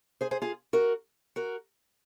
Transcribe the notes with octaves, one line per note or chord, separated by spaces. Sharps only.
G#4 C5
G#4 C5
F4 G#4
F#4 A#4
F#4 A#4